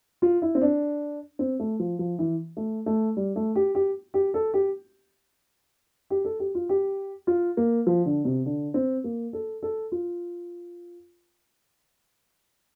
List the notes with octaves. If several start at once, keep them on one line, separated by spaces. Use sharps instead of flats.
F4
E4
C4
D4
C4
A3
F3
F3
E3
A3
A3
G3
A3
G4
G4
G4
A4
G4
G4
A4
G4
F4
G4
F4
A#3
F3
D3
C3
D3
C4
A#3
A4
A4
F4